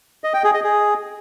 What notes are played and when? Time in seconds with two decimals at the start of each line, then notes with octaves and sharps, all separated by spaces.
0.24 D#5
0.34 G5
0.44 G#4
0.54 D#5
0.64 G#4